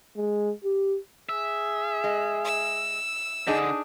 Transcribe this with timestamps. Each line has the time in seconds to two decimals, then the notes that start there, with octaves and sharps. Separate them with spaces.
0.17 G#3
0.64 G4
1.29 G#4 E5
2.04 G#3
2.45 E6
3.47 D3 D4 D#4 G#4